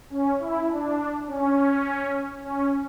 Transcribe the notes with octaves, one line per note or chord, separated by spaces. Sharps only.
C#4
E4
D4
C#4
C#4